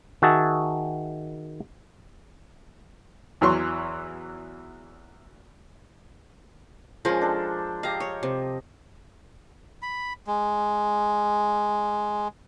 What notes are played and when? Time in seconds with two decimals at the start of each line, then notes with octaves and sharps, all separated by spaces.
0.22 D#3 F#4 G#4 E5 A5
3.41 E2 E3 F#3 C6 C#6
7.05 F3 G#3 C#4 A#4 C5
7.21 D4 A4
7.83 G4 D#5 F5 A#5
8.00 C#5
8.23 C3
9.82 B5
10.27 G#3